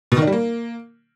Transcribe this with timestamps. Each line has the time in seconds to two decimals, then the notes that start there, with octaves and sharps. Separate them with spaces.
0.12 B2
0.17 D#3
0.22 D4
0.27 G3
0.33 A#3